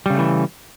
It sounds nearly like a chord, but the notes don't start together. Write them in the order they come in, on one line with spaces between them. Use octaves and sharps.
G3 C#3 A3 E3